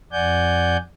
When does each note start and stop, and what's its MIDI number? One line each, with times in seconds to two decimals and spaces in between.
0.12 0.77 41
0.12 0.77 74
0.12 0.77 78
0.12 0.77 80
0.12 0.77 91